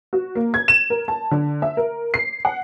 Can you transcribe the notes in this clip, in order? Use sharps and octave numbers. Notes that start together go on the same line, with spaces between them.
F#4
A#3
G#6
E7
A#4
A5
D3
E5
A#4
C7
F#5